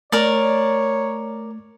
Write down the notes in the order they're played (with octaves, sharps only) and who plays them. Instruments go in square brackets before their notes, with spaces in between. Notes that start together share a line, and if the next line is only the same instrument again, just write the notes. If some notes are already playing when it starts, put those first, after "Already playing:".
[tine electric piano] A3 [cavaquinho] A#4 D5 [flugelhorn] C#5